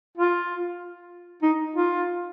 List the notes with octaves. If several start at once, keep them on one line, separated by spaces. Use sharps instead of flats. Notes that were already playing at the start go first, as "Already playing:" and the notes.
F4
D#4
F4